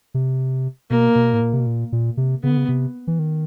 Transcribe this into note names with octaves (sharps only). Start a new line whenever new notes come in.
C3
B2 A#3
B2
A2
A#2
C3
B2
A#2
A#2
C3
C#3 B3
D3
C#3
C3
E3
D#3